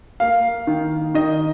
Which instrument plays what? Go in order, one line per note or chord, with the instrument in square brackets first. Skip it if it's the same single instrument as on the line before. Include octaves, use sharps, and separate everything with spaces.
[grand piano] A#3 F5
D#3
D#3 D#5